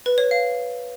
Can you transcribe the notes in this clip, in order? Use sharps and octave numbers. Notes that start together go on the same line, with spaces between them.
B4
C#5
F5